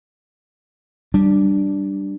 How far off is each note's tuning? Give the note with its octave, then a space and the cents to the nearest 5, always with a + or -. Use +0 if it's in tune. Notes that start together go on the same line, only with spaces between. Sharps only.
G3 -10 D4 +0